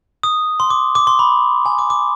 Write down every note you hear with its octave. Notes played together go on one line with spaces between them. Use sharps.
D#6
C6
D6
D6
C6
B5
G#5
D6
D6